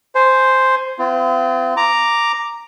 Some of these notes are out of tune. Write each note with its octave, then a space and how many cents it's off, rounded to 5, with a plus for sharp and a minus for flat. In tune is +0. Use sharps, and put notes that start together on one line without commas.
C5 +0 G#5 +15
C4 -40 F4 -35
A#5 +0 D6 +0